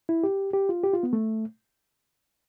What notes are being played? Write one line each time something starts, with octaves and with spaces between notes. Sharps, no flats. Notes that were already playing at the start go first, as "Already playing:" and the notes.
E4
G4
G4
F4
G4
F4
B3
A3